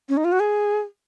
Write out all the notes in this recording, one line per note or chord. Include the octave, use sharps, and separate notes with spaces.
C#4
D#4
F4
F#4
G#4